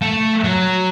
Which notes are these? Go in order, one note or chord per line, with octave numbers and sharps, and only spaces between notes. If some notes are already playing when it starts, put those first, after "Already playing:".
A3
F#3